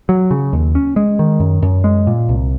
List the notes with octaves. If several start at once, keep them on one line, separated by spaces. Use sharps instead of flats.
F#3
C#3
D#2
C#4
G#3
D#3
F#2
F#2
G#3
A#2
C2